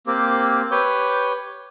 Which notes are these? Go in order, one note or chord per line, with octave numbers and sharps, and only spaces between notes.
A#3 C4 G4
G4 B4 C#5 G6